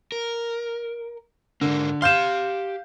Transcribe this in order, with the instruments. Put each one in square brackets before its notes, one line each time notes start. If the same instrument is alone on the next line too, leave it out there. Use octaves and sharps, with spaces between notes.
[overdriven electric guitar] A#4
[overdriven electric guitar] G#2 A#3 [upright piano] D3
[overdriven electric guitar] G4 C6 [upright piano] F5 G6 E7